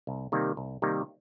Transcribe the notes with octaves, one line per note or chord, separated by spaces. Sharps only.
C2
C3 D#3 G3 A#3
C2
C3 D#3 G3 A#3